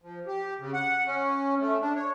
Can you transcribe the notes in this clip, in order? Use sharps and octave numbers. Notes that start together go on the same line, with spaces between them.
F3
G4
C#3
F#5
C#4
A3
D4
C#5